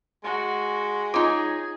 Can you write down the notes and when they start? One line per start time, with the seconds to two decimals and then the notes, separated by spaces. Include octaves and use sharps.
0.24 G#3 F#4
1.14 D#4 F4 G#4 C#5